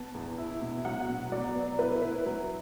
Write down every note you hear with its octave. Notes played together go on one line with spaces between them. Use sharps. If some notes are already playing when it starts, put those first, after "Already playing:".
Already playing: B3 A5
E2
E4
B2
F#3 F#5
B2
F#3 D5
B3
E4 B4
E4 B4
F#3